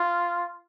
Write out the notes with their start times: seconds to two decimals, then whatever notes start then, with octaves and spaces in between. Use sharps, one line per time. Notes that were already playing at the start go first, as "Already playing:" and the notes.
Already playing: F4